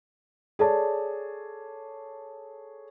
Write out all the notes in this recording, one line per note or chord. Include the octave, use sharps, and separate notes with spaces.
G#4 A4 C#5 D5 A5